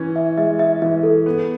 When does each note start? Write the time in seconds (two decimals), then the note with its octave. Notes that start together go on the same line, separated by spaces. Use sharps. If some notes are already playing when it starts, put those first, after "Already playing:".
Already playing: E3 C#4
0.16 E5
0.38 G#3 E5
0.59 E5
0.82 E3 E5
1.03 A4
1.26 B3